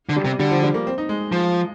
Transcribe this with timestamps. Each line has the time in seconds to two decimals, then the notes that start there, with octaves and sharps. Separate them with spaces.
0.09 D3
0.16 G3
0.25 C3
0.39 D3 G3
0.51 F3
0.63 G3
0.74 A#3
0.87 C4
0.98 D#4
1.09 G#3
1.32 F3